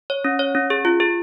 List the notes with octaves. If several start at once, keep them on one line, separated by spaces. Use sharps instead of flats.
C#5
C#4
C#5
C#4
G#4
F4
G#4